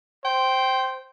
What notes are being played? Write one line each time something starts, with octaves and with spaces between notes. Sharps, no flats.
C5 G5